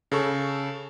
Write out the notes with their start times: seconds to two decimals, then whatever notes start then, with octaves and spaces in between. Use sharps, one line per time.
0.12 C#3 A4 C#6